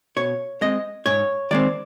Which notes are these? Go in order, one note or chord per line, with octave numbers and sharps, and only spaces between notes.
B2 C#5
G#3 C4 D#5
G#2 C#5
D#3 G#3 C4 D5